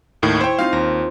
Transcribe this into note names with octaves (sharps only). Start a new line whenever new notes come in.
D#2 A2 D#3
E4 C5 C#5 G5
C4 D#4 F4 F5
D#2 A#5